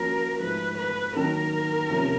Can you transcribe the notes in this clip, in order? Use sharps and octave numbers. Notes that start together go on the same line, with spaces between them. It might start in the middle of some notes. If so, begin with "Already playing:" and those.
Already playing: F3 A#3 C#4 F#4 A#4
G#2 F3 A3 B4
B4
D#3 F#3 A#3 A#4
C3 F3 A#3 C#4